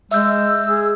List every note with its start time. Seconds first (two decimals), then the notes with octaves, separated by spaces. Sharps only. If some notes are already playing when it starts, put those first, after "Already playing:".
0.11 G#3 E5 E6 G6
0.66 G#4